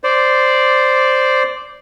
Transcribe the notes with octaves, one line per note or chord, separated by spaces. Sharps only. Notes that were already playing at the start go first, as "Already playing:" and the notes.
C5 D5